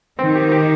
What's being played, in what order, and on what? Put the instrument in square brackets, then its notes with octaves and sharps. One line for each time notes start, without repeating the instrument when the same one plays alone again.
[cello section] D#3 [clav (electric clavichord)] C4
[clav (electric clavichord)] G4
G4